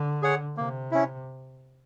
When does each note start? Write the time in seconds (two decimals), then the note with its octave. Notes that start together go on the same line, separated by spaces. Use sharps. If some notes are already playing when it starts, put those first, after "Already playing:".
Already playing: D3
0.22 G#4 C#5 F#5
0.57 C3 A#3
0.91 C#4 E4